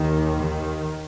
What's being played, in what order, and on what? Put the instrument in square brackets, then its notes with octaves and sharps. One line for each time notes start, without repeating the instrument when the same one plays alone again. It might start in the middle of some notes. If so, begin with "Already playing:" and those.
Already playing: [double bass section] D#2 D#3
D#3